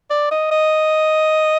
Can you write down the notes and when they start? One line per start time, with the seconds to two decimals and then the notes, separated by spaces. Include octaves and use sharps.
0.10 D5
0.31 D#5
0.51 D#5